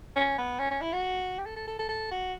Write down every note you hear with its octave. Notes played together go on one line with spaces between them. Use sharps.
C#4
B3
C#4
C#4
E4
F#4
G4
A4
A4
A4
A4
A4
F#4